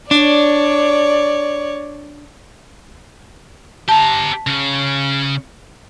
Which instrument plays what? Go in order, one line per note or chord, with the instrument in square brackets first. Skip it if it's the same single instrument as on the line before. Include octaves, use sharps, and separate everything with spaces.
[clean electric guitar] D4 [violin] C#5 D5
[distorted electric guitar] G4 A#5 [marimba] A5
[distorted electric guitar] C#3 C#4